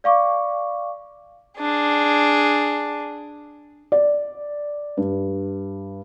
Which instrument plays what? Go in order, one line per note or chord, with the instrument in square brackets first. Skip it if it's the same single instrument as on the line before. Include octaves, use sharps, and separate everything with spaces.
[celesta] D5 F5 C#6 D6
[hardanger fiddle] D4 G#4
[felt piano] D5
G2